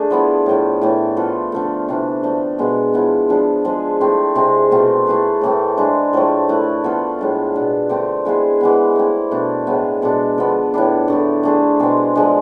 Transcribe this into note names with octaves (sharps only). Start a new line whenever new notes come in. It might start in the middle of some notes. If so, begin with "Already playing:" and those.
Already playing: A3 D4 G#4
F3 B3 E4
A2 F3 A3
A2 E3 A3
F3 B3 F4 A4
D3 F3 A3
C3 E3 A3 D4
D3 F3 A3
B2 G#3 B3
F3 B3 E4
F3 B3 D4 G#4
F3 G#3 D4 G#4
A3 C4 E4 G#4
C3 G#3 C4 G#4
B2 A3 C4 F4
A3 E4 G#4 B4
A2 E3 A3 C4
G#3 D4 G#4
A2 F3 A3
A3 E4 B4
F3 B3 F4 A4
A2 G#3 D4
B2 B3 D4
D3 A3 C4
G#3 B3 E4 G#4
E3 G#3 B3
A3 C4 E4
B2 A3 D4
A2 G#3 B3
B2 G#3 D4 A4
D3 F3 B3
A2 E3 B3 D4
D3 A3 E4
A3 D4 G#4 C5
B2 G#3 C4
D3 F3 G#3 D4